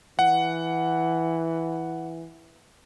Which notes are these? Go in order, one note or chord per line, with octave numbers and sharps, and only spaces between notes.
E3 F#5